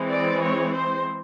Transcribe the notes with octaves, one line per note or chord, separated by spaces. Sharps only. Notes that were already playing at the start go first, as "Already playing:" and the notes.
Already playing: E3 G#3 C4
D5
C#5
C5